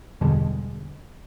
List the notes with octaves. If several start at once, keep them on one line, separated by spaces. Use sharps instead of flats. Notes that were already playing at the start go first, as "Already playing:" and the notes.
E2 G2 B2 D3 G3 G#3